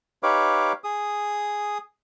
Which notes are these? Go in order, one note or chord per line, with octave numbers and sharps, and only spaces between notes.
D#4 G4 B4 C#5 F5 D6
G#4 D#6